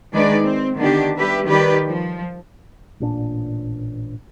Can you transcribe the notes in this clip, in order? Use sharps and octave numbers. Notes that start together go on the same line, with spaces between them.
D#3 G#3 D4 D#4 B4 D5
C4
D3 D#3 B3 D4 G4
G3 G4 B4 E5
D#3 G3 G4 B4 D5
F3
A1 A#2 D4